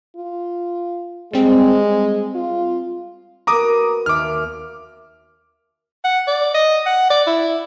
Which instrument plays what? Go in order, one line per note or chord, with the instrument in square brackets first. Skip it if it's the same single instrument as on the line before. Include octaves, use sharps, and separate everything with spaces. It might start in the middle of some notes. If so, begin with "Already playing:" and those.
[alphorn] F4
[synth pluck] G3 C4 [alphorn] G#3
[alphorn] F4
[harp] B3 F#4 A#4 [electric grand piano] A#5 D6 D#6
[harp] D#2 E5 [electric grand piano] D6 F6
[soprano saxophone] F#5
D5
D#5
F#5
D5
E4